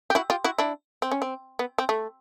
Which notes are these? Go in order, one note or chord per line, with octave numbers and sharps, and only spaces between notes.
G4
E4 F#4
F4 G4
E4 F#4
D4 E4
C4
C#4
C4
B3
C4
A3